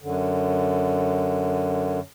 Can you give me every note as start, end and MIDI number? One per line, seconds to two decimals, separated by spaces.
0.02 1.99 42
0.02 1.99 50